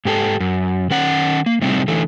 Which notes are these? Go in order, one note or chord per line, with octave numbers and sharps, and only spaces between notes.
G#2 G4 A4
F#2
D#3 C#4 F#5 A#5
A#3
A2 C3 G3 C4 D#4 E4
D3 E3 A3